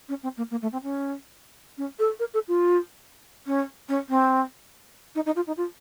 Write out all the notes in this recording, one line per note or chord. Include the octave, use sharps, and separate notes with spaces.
C#4
C4
A#3
A#3
A3
C4
C#4
C#4
A4
A#4
A4
F4
C#4
C#4
C4
D#4
D#4
F4
D#4
F4